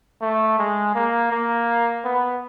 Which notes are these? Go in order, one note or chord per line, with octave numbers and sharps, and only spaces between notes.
A3
G#3
A#3
A#3
B3